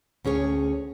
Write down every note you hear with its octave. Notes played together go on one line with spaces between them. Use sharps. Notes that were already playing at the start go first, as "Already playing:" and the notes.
D2 C#4 G#4 C#5